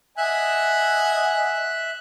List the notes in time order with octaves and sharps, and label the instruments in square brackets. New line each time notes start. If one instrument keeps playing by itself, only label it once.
[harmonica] D#5 F#5 G#5 [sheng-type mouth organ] E5 F#6